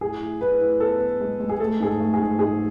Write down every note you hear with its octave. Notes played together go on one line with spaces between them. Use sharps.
A2 G#4
A2
A2 B4
A2
B3 A4
B3
G#3
G#3
G#4
A3 A4
G#2 G#4
A4
A3
G#4
G#2
G#2 G#4